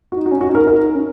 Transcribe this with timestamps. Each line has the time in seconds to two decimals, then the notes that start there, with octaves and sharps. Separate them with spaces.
0.12 D#4 F#4
0.26 F#4
0.31 C#4
0.41 F#4
0.50 D#4
0.55 A#4
0.67 D#4 A#4
0.95 C#4